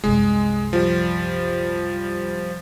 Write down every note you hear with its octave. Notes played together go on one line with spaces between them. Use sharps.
C2 F#2 G#3
F3 G3